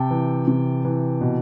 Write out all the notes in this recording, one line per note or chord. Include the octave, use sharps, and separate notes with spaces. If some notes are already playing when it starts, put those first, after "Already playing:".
Already playing: C3 G5 A5
E3
C3
E3
B2